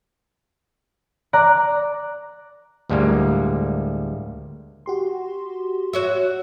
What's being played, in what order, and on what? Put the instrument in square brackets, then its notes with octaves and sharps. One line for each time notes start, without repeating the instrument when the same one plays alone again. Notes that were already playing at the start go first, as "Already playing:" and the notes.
[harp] D5 A#5 D6 F#6
[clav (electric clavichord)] D2 A2 G3 G#3 A#3
[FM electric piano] F#4 G4 C6
[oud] F#4 C#5 E5